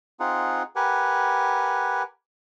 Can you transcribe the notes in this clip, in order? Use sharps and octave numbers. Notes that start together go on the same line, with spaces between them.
C4 D#4 F4 G#4 F#5
G4 A#4 B4 F#5 G#5